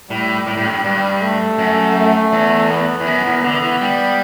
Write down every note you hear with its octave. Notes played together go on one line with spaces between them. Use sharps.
A2 G3
A2
A2
G2
G2 G3
A3
F#2
A3
E2
B3
E2
F#2
E2
D3 B3
E3
G3